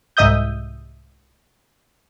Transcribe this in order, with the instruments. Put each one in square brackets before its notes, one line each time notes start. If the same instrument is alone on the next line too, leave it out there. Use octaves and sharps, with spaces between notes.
[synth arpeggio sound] C2 G#2 D#5 E5 D#6 G6